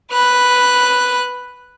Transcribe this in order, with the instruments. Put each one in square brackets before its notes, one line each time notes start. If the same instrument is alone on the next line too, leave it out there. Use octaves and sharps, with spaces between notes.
[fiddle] B4 F#6